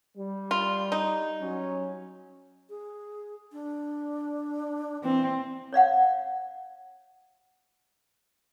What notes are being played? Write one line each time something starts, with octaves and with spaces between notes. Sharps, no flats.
G3
F4
D#4
F#3 C#4
G#4
D4
E3 C4
C#5 D5 F5 F#5